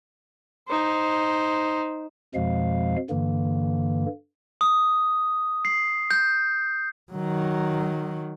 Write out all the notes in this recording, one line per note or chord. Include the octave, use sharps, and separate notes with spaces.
D#4 C5
F2 B2 F3 G#3 F5
G2 D3 E3 A#3
D#6
C7
G6
D#3 F#3